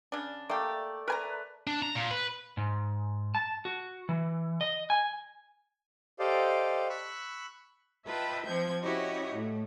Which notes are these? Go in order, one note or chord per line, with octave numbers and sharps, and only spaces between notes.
C#3 D4
A3 A#3 G4 D5 A5
A#4 B4 G#5 A#5
D4
A#5
A#2
B4
G#2
A5
F#4
E3
D#5
G#5
G4 A4 C5 D5 D#5 F5
B5 C#6 E6 F#6
F4 B4 D#5 E5 G5 A5
F3 C4 G6 G#6
C#4 E4 F#4 G4 C#5 D#5
A2 A3